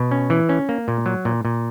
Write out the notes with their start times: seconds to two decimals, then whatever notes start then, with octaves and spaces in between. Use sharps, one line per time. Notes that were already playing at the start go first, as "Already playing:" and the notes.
Already playing: B2
0.11 C#4
0.30 E3
0.49 C#4
0.69 A#3
0.88 A#2
1.06 F#3
1.25 A#2
1.45 A#2